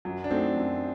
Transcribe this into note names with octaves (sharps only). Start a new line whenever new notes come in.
F#2 F#3
D4
F#3 A3 C4 D#4 A4
F#2